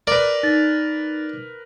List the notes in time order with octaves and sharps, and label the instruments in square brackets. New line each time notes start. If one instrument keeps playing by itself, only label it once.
[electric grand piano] A#4 B4 [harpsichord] D5
[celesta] D#4 A6